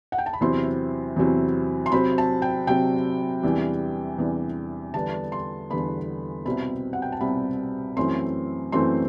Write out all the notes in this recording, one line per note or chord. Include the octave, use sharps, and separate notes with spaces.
F#5
G5
A5
B5
E2 C3 F#3 C4 E4 C6
E2 C3 F#3 C4 E4
C6
C3 F#3 C4 B5
A5
G5
C3 F#3 C4 G5
E2 C3 E3 G3 D4
E2 C3 E3 G3 D4
E2 D3 G3 B3 D4 A5
C6
E2 D3 G3 B3 D4 B5
C2 B2 G3 C4 B5
F#5
G5
A5
C2 B2 G3 C4 B5
F#2 E3 A3 C4 C6
F#2 E3 A3 C4 C6